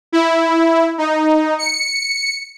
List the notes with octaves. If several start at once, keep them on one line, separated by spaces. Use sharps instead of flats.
E4
D#4
C#7